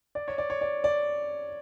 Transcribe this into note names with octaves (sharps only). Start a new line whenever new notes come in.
D5
C#5
D5
C#5
D5
D5